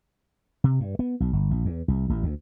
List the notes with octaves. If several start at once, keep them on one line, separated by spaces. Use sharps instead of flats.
C3
G2
B3
B1
G1
A#1
E2
C2
A1
D2